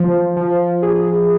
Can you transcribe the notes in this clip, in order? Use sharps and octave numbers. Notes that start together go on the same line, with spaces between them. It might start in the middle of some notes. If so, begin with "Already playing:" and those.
Already playing: F3
F3
G#4